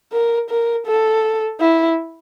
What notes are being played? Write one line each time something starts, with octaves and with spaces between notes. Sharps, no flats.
A#4
A#4
A4
E4